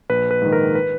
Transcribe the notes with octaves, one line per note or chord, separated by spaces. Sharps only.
A#1 B4
B4
G#2 D#3
A#4
B4